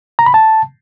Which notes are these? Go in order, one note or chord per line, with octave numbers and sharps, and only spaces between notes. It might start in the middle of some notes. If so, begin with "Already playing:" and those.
A#5
B5
A5